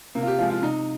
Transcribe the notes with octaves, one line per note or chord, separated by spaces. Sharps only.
C3 A#3
F4
G4
F3 G#3 F4
F4
C3 D#4